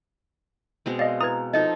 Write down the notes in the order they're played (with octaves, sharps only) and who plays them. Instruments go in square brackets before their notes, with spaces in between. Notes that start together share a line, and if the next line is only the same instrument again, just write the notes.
[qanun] B2 G#3 C4
[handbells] D5 D#5 [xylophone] F5
[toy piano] E4 B4 [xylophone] A#5 [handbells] D#6 G#6
[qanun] F3 D#4 A4 [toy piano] D#5